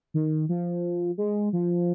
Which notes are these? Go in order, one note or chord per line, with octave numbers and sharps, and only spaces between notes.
D#3
F3
G#3
F3